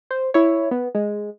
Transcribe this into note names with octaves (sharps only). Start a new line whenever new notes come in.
C5
E4 C#5
B3
G#3